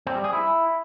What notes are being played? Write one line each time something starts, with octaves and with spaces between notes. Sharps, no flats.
C4
G3
G#4
E4